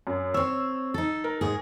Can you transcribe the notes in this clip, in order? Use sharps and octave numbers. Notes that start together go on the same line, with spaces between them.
F#2
C4 C#5 E6
D#4 A4
A#4
G#2 G#4